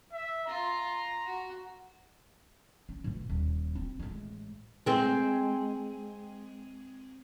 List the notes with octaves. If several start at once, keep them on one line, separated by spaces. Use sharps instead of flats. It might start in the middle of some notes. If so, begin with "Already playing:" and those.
E5
F4 A#5
F#4
C#4
A2 E3
D#1
C4
A1 G#3
G#3 C4